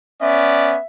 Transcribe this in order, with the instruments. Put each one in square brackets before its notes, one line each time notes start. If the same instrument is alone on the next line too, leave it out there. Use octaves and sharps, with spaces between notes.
[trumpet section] B3 C#4 D5 [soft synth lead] E5